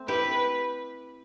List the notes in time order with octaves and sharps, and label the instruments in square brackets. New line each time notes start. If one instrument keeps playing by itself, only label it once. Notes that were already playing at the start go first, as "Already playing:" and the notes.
Already playing: [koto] A3 C4
[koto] E4 G4 [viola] B4